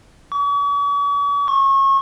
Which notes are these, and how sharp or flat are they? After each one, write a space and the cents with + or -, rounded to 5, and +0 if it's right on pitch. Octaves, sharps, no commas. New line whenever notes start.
C#6 +45
C#6 -30